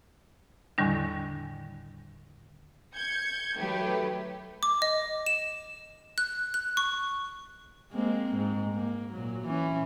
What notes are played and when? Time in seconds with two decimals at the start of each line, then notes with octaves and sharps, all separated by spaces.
0.78 E2 A2 D3 D#3 G3 D4
2.95 G6 G#6 C#7
3.57 D#3 F#3 A3 G4 B4
4.63 D6
4.82 D#5
5.26 E7
6.18 F#6
6.54 F#6
6.77 C#6
7.92 G#3 A#3 C4
8.36 G#2
8.72 A#3
9.12 A#2 F#3
9.46 E3 C#4